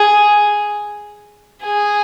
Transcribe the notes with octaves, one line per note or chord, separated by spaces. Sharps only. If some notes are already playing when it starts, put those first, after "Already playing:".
Already playing: G#4
G#4